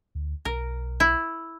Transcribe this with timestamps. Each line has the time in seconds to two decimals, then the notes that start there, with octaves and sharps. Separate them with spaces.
0.15 D2
0.45 B1 A#4
1.00 E4